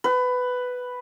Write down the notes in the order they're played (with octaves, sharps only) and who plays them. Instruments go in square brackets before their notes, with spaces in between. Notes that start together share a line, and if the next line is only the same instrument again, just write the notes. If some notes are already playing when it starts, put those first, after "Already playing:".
[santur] B4